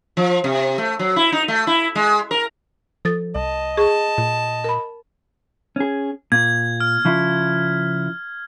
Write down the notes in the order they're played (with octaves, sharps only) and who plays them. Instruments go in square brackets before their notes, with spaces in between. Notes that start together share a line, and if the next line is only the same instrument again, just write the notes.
[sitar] F3
C3
A3
F#3
E4
D#4
A3
E4
G#3
A#4
[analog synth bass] F3 [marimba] A4 D#6 A6
[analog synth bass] C2 [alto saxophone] D#5 [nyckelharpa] A5
[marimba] G#4 C#6 [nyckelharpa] A5
[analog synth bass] A#2
[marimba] A#4 B5
[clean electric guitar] C#4 G#4
[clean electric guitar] A#2 [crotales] G#6
[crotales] F6
[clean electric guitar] C#3 F3 E4